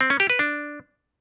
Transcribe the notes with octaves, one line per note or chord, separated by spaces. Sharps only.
C4
C#4
G4
B4
D4